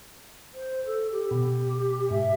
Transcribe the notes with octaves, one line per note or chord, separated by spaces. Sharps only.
C5
A4
G4
B2
G#2 E5